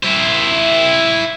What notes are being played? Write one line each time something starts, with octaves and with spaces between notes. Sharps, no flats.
E4 C5